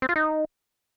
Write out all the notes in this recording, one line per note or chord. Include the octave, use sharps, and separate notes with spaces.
C4
F4
D#4